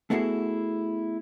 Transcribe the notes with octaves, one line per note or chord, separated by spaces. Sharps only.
A3 B3 E4 F#4 G#4 A4